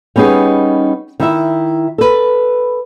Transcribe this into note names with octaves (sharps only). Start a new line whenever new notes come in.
G3 B3 C#4 D#4 G#4
D#3 E4 E5
A4 B4